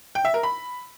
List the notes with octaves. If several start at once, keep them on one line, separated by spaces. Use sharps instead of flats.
G5
E5
A#4
B5